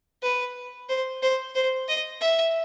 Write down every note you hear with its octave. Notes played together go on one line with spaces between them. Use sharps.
B4
C5
C5
C5
D#5
E5